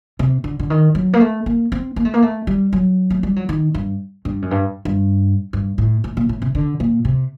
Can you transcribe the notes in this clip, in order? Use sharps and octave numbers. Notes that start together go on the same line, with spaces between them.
C3
D3
D3
D#3
F#3
A#3
A3
A#3
C4
A#3
A3
A#3
A3
G3
F#3
A3
G3
F#3
D#3
G2
G2
F#2
G2
G2
G2
A2
A2
A#2
A2
C3
D3
A#2
C3